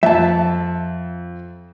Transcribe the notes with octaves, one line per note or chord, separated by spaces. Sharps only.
F2 E5 A5